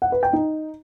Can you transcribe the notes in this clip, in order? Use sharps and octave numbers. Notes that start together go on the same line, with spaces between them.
F#5
B4
G5
D#4